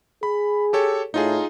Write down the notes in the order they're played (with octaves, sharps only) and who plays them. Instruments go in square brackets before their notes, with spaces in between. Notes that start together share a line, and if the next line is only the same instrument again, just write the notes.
[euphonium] G#4 [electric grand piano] B5
[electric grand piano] G4 A4 C#5
[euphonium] A2 [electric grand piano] D#4 F4 G#4